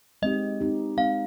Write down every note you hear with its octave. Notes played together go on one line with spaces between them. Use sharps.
G#3 C4 D#4 G4 D#5
G#3 C4 D#4 G4
G#3 C4 D#4 G4 F5